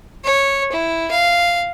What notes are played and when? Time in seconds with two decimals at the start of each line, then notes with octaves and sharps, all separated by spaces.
0.25 C#5
0.72 E4
1.11 F5